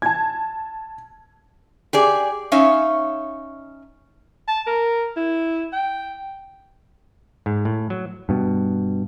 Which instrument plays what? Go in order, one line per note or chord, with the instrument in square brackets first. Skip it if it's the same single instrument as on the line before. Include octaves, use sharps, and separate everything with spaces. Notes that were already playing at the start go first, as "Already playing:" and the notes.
[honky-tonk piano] A5 G#6
[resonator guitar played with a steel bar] G4 G#4 D5
C#4 D#4 C#5 E5 F5
[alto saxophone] A5
A#4
E4
G5
[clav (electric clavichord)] G#2
A2
F#3
[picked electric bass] G2 B2